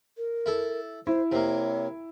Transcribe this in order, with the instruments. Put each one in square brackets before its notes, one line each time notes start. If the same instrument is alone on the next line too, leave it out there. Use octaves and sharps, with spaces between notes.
[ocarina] A#4
[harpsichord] E4 A4
[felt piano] E4 [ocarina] C5
[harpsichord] C3 A#3 [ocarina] C#5